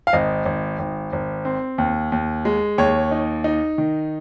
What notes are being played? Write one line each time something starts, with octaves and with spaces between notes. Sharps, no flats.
F5
G#1 D#5
G#1
G#1
G#1
C4
D#2
D#2
G#3
D#2 C#5
D#4
D#4
D#3